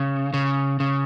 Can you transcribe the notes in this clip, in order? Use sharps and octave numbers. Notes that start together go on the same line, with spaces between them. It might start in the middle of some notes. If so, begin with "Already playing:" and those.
Already playing: C#3
C#3
C#3